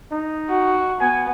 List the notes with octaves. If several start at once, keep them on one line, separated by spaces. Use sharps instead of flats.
D#4
F#4
B3 G#5